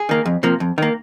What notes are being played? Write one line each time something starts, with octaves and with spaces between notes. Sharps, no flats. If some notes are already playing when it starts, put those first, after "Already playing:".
Already playing: G#4
D#3 A#3
F2
C3 F3 A#3
F2
D#3 A#3